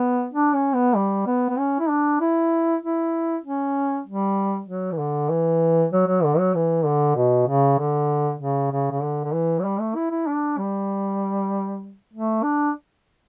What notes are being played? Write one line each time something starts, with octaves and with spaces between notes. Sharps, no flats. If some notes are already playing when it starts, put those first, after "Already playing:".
Already playing: B3
D4
C#4
B3
G3
B3
B3
C#4
E4
D4
E4
E4
C#4
G3
F#3
E3
D3
E3
F#3
F#3
D3
F#3
E3
D3
B2
C#3
D3
C#3
C#3
C#3
D3
D3
E3
F#3
G3
A3
E4
E4
D4
G3
A3
D4